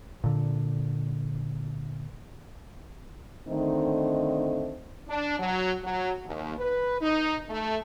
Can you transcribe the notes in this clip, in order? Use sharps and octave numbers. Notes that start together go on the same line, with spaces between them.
A#2 D3
D3 D#3 A3 C4 D#4
D4
F#3
F#3
D#2
B4
D#4
A3